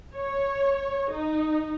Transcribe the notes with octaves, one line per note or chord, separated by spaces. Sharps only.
C#5
D#4